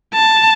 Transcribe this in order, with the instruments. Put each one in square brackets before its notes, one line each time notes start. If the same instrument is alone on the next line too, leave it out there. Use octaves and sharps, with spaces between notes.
[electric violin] A5